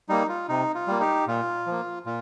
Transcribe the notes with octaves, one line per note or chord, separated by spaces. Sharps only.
G3 A#3 D#4
F4
C3 D#4
F4
G3 A#3
D#4 G4
A#2 F4
F3 A#3
A#2 F4